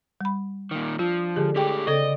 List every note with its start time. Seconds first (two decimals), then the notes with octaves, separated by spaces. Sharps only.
0.21 G3 B5
0.71 A#2 D#3
0.99 F3 D4 F4
1.36 D3 G#3 G4 G#4
1.56 A2 G4 G#4 G5
1.87 C#3 C4 A4 D5 D#5